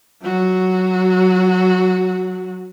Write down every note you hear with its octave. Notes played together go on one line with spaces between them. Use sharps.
F#3 F#4